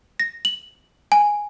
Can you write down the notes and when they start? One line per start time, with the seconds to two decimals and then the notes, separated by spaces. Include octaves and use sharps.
0.20 A#6
0.45 F#7
1.12 G#5